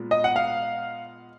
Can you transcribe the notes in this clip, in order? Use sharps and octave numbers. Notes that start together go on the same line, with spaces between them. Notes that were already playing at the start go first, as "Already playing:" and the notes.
Already playing: A#2 G#3 B3
D#5
F#5
F5